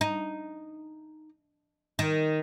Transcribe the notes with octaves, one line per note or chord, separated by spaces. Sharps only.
D#4
D#3